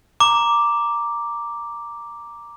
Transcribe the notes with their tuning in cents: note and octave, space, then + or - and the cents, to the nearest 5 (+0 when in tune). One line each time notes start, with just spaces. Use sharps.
A#5 +0 D6 +0